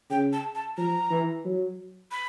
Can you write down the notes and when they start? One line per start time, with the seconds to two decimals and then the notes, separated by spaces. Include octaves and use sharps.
0.10 C#3 G5
0.33 A5
0.55 A5
0.77 F3 A#5
1.11 E3
1.45 F#3
2.12 B5